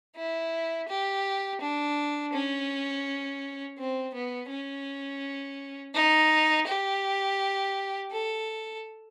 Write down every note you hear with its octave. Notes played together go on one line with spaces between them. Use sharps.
E4
G4
D4
C#4
C4
B3
C#4
D#4
G4
A4